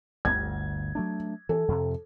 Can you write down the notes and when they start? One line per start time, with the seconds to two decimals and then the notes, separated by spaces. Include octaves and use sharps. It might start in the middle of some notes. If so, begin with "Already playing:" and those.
0.25 G1 D2 G#6
0.95 F#3 A3 D4
1.49 E3 A4
1.68 F2 C3